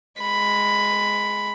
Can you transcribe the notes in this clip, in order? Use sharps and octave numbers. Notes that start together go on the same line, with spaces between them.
G#3 B5